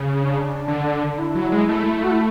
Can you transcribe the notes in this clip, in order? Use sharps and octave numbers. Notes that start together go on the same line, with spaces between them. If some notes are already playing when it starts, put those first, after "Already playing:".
Already playing: C#3
D4
D3
E4
F#3
G#3
A3
F#4
E4